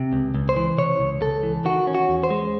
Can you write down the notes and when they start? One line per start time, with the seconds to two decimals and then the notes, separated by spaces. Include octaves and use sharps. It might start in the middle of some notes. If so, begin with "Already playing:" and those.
Already playing: C3
0.13 C#2
0.34 C#2
0.49 C5
0.56 E3
0.78 C3 C#5
1.00 C#2
1.22 C#2 A4
1.43 E3
1.65 D#3 F#4
1.87 C#4
1.95 F#4
2.09 E2
2.23 C5
2.30 G#3